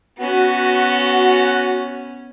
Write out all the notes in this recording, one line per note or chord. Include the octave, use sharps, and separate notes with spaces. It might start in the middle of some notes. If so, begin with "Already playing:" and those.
B3 C#4 F#4